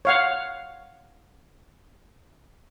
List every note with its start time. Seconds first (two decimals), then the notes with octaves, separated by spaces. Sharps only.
0.05 C#5 F5 F#5